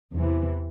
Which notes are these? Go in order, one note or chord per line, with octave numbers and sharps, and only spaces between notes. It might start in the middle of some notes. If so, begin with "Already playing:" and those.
E2 C3 E3